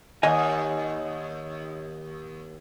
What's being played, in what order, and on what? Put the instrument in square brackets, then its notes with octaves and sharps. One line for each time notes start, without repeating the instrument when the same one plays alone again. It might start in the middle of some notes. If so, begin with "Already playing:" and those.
[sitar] D#2 [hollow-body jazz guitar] D#5 G#5